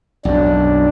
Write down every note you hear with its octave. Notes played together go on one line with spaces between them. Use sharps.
B1 F#2 D4